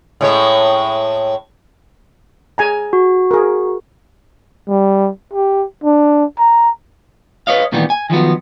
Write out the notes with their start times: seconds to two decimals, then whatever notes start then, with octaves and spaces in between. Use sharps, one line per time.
0.21 A2 G#3 C#5
2.58 G#4 G#5 A#5
2.93 F#4
3.31 G#4 A#4
4.68 G3
5.34 G4
5.84 D4
6.39 A#5
7.47 B4 C#5 D#5 F5
7.72 A#2 D#3 E3 G3 B3
7.90 G#5
8.10 D#3 F3 F#3 B3